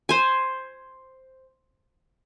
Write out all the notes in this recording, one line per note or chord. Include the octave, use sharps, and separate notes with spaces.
C5 G#5